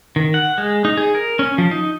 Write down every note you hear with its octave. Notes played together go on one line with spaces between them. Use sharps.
D#3
F#5
G#3
D#4
G#4
A#4
C#4
F3
D#4